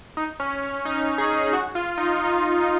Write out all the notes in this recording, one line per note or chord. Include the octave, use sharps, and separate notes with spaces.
D#4
C#4
C#4
D#4
G#4
F#4
F4
D#4
D#4